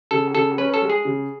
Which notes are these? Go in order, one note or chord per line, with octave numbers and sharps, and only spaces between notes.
C#3 A4
C#3 A4
C#4 B4
A4
G#3
G#4
C#3